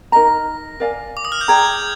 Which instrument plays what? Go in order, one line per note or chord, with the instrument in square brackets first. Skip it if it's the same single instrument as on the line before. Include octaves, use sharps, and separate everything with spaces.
[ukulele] D#4 A#4 D#5 A#5 [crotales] A#6
[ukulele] A#4 D5 F5 G#5
[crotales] D6
D#6
F6
G6
[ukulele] G#4 D5 G5 A#5 [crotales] G#6